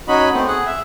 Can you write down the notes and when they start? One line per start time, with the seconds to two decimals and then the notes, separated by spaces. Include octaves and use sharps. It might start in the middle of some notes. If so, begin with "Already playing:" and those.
0.08 C#4 D#4 F#4 D#5 B5
0.33 A3 B3 C4
0.47 G#4 F#5
0.66 E5